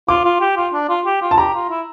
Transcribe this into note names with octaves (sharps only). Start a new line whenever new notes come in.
F4 D6
F4
G4
F4
D4
F4
G4
F4
A5
G4 A#5
F4
E4